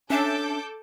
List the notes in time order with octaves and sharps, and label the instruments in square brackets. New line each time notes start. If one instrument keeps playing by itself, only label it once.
[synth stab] C#4 E5 A5 [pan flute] D4 [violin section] A4 D6 G6